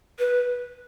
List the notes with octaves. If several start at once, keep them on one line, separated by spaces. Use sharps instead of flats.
B4